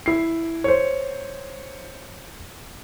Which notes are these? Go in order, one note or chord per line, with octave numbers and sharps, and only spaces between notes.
E4 C7
C5 C#5